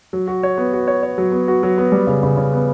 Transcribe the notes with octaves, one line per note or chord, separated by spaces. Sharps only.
F#3
F#4
C#5
B3
F#4
C#5
C#5
F#3
B3
F#4
F#3
B3
G3
C#3
C#3
C#3
B3